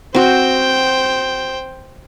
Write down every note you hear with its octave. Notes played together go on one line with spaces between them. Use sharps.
C4 F#4 C5 G5